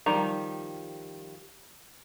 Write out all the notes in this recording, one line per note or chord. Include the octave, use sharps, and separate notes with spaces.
D#3 F3 G3 A#5